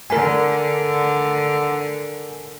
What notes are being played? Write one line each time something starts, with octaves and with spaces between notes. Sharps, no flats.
D3 A#4 G#5